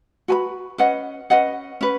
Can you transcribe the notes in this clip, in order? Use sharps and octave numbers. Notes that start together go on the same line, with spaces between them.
F#4 B4 G#5 B5
C#4 B4 D#5 F#5
C#4 B4 D#5 F#5
C#4 B4